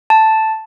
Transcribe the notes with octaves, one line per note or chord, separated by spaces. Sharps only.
A5